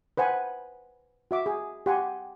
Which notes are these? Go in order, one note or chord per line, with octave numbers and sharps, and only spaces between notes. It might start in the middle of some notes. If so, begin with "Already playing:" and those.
B4 C5 F#5 G#5
F#4 E5 D6
G#4
G4 F#5 G#5 C6